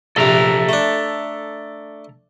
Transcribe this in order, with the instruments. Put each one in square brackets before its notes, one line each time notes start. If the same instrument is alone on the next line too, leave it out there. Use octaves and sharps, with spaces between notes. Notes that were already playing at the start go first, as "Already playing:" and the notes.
[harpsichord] A#1 C3 [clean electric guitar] A4 E5 A#5
[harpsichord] A3 D4